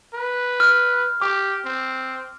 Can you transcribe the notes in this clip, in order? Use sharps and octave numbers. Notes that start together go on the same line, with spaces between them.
B4
F6
G4 D6
C4